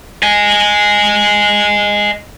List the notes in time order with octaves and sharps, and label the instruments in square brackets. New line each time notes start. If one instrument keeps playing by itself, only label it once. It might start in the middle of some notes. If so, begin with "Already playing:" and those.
[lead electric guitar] D#5 G#5